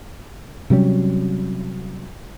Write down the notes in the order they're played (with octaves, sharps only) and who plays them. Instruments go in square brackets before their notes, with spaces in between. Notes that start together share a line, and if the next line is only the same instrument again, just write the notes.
[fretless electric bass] C3 F#3 G3 C#4